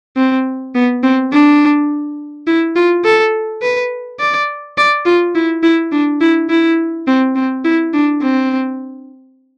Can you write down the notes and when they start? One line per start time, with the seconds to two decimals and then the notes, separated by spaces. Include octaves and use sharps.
0.17 C4
0.75 B3
1.03 C4
1.33 D4
2.47 E4
2.76 F4
3.04 A4
3.62 B4
4.20 D5
4.78 D5
5.05 F4
5.35 E4
5.63 E4
5.92 D4
6.21 E4
6.50 E4
7.07 C4
7.36 C4
7.65 E4
7.94 D4
8.22 C4